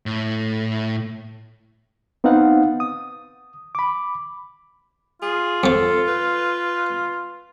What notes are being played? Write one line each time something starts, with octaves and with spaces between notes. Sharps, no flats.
A2
B3 C4 D#4 B4 F5 F#5
D#6
B5 D6
F4 G#4
F2 F3 A4
B4